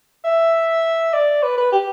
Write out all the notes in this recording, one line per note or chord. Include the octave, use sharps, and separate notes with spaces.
E5
D5
B4
B4
G4